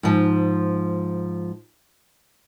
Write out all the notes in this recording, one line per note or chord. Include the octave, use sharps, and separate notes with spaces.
G#2 F3